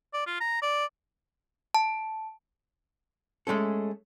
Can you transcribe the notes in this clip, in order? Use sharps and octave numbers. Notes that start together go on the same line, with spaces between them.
D5
F4
A#5
D5
A5
G#3 A3 C#4 A4